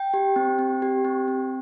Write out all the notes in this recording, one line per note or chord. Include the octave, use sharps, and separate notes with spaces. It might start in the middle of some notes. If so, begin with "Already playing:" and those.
Already playing: G5
G4
C4
C4
G4
C4
C4